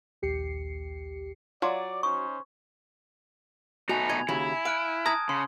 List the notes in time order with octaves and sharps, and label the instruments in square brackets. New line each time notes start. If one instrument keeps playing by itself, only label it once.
[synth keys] A#1 D#2 G4 C7 C#7
[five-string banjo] F#3 [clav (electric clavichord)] F4 [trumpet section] D5
[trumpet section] C#4 D#4 C5 [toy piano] C#6
[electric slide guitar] B2 A3 D#4 [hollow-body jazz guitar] F#4 [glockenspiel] G#5 F7
[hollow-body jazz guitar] D#5 [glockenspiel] G#6
[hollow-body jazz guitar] D#2 C#3 F#4 [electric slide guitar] E4
[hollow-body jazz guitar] F5 [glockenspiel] F6 F#6 D7
[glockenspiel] A5 D#6 G#6 [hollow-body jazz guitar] A#5
[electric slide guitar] C#3 [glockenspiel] C6